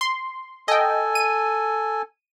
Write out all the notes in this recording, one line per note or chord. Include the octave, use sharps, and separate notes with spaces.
C6
A4 D#5 G5 G#5
D#7